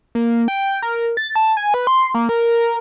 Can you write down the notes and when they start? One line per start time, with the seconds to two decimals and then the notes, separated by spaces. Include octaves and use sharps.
0.15 A#3
0.48 G5
0.82 A#4
1.17 A6
1.36 A5
1.57 G#5
1.74 B4
1.87 C6
2.14 A#3
2.29 A#4